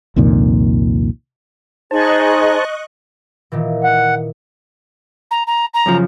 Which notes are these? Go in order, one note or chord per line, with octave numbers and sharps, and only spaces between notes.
C2 F2 A#2 D#3
D#4 G#4 C5 D#5 A5 C#6 F#6
A#2 D#3 E3
F#5
A#5
A#5
A#5
F#2 C#3 F3